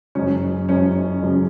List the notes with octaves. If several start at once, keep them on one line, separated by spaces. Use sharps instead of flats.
F#1 F#2 C#3 C#4
F#1 F#2 C#3 C#4
F#1 F#2 C#3